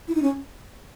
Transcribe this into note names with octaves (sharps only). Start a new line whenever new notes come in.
E4
D#4
C#4